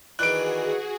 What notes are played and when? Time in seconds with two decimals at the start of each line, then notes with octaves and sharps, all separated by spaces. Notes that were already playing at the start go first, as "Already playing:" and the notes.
0.19 D#3 E3 D4 F#4 G#4 F#6 D7